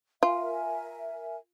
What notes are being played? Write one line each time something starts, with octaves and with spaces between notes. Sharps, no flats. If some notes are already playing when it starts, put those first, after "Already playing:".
F4 A#4 E5 G#5